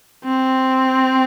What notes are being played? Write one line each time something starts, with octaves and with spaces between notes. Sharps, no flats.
C4